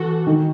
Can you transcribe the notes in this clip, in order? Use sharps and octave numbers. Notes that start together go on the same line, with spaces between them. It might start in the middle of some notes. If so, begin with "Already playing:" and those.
Already playing: E3 F#4 A4
D#3